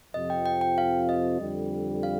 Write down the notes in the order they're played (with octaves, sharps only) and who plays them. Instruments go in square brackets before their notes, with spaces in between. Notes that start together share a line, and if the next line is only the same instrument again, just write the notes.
[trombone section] F2 C3 F3 [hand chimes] D#5
[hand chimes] G5
G5
G5
F5
D#5
[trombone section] F2 D3 G3
[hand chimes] F5